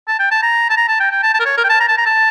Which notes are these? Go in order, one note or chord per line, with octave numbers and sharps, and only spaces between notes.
A5
G5
A5
A#5
A5
A#5
A5
G5
G5
A5
A5
A#4
C#5
A#4
G5
A5
A#5
A5
A#5
A5